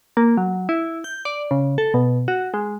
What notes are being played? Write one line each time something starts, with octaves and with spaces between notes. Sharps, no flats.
A#3
F#3
E4
G6
D5
C#3
A4
B2
F#4
G#3